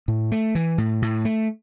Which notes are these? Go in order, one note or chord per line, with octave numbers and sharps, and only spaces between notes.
A2
A3
E3
A2
A2
A3